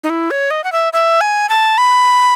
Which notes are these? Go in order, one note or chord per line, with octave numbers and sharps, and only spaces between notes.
D#4
E4
C#5
D#5
F#5
E5
E5
G#5
A5
B5